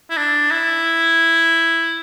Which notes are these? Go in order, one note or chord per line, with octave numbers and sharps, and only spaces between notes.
E4
D4
E4